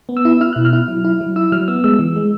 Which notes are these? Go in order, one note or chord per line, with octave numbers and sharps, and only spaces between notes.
B3
E6
E4
E4 F6
B2 F#6
F6
E4
F#3
E4
F#3
E4 E6
F#3 F6
B3 E6
G#3 E6
E3
G#3